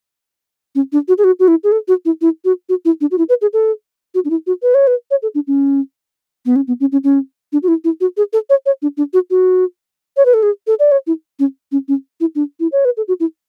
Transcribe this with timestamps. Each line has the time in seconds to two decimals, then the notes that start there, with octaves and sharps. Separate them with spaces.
0.75 C#4
0.92 D4
1.08 F#4
1.18 G#4
1.24 F#4
1.39 F#4
1.48 E4
1.64 G#4
1.72 A4
1.88 F#4
2.05 E4
2.21 E4
2.45 F#4
2.69 F#4
2.85 E4
3.01 D4
3.11 F#4
3.18 E4
3.29 B4
3.41 G#4
3.53 A4
4.14 F#4
4.25 D4
4.30 E4
4.47 F#4
4.62 B4
4.74 C#5
4.87 B4
5.11 C#5
5.22 A4
5.35 D4
5.47 C#4
6.46 B3
6.56 C#4
6.67 B3
6.80 C#4
6.92 C#4
7.04 C#4
7.52 D4
7.63 F#4
7.68 E4
7.84 E4
8.00 F#4
8.17 G#4
8.33 A4
8.50 C#5
8.66 C#5
8.82 D4
8.97 D4
9.13 F#4
9.30 F#4
10.17 C#5
10.25 B4
10.34 A4
10.43 G#4
10.67 A4
10.79 D5
10.91 C#5
11.07 E4
11.39 C#4
11.72 C#4
11.88 C#4
12.20 E4
12.35 D4
12.60 E4
12.72 C#5
12.85 B4
12.97 A4
13.08 F#4
13.20 E4